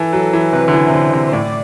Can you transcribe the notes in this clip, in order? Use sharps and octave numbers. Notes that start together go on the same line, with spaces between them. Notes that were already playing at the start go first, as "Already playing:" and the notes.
Already playing: E3 A4
F#3
E3
C3 B4
D3
E3
C3
D3 C5
C3
C5
A2 D5